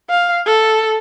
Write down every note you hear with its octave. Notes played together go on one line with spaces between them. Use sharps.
F5
A4